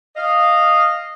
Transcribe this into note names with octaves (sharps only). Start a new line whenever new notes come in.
D#5 F5